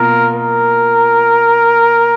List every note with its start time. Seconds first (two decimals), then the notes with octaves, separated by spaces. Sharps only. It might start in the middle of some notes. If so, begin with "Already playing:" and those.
Already playing: B2 A#3 F4 A#4
0.34 A#4